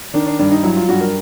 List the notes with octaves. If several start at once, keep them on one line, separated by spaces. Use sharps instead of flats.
D#3 D4
D4
G2 D4
D#4
F#3 E4
F4
G2 F#4
A#4